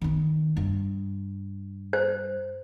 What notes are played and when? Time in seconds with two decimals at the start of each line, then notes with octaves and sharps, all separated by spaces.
0.02 D#3 B3
0.57 G2
1.93 C5